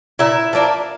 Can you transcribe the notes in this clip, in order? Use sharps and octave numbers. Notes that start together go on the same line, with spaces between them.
A#2 E4 E5
F3 A#3 D4